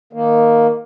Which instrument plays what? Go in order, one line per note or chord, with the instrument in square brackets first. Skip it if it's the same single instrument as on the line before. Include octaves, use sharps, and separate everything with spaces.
[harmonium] D#3 A#3